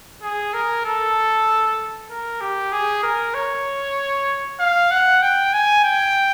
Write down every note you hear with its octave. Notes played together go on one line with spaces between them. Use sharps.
G#4
A#4
A4
A#4
G4
G#4
A#4
C#5
F5
F#5
G5
G#5
G5